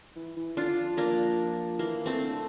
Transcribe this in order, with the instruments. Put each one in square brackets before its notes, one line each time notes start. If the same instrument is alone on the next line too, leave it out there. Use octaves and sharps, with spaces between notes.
[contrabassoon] E3
E3
[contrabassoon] D3 [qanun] D4 F4
[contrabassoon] F3
[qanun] A#3 D4
[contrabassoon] E3 [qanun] A#3
[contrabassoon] E3
[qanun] A3 C4
[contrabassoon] D3